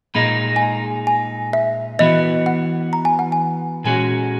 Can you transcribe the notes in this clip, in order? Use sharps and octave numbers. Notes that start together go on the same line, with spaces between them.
A#2 G#3 D#4 B5
G#5
A#5
G#5
E5
E3 B3 F#4 D#5
F#5
A#5
G#5
F#5
G#5
A#2 G#3 C#4 F#4 G#5